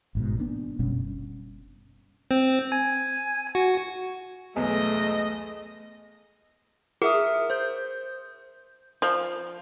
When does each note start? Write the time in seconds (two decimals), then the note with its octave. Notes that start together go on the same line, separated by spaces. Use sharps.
0.15 A1 G#2 B2
0.39 A#3 B3 D4
0.79 F#1 B2 G3 C#4
2.31 C4
2.72 G#5
3.55 F#4
4.56 B1 E2 G#3 A3 D#5
7.02 G#4 A#4 E5 D#6
7.50 C5 G6
9.02 F3